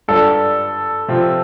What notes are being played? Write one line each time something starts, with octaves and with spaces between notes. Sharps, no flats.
G2 G3 D4 F4 A4
C3 F3 C4 F4